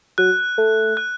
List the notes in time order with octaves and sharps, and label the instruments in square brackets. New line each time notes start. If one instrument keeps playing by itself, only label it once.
[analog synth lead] F#3 [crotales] F#6
[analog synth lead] A3
[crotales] F#6